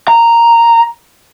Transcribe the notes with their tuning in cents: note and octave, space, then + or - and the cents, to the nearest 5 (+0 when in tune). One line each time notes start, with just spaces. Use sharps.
A#5 -5